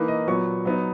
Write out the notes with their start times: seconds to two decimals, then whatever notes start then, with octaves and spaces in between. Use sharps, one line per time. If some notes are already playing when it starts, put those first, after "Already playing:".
Already playing: E3 A#3 D#4 B4
0.08 D#5
0.27 A#2 F#3 B3 C#6
0.65 F#3 B3 D#4